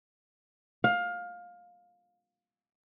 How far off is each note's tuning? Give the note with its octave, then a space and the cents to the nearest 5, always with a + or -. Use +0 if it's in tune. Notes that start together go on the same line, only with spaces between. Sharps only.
F5 +20